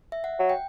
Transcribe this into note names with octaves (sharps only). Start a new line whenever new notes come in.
E5
F#5
F#3
G5